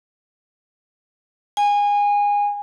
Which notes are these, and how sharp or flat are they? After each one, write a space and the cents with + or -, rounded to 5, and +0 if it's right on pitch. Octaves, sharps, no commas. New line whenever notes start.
G#5 -20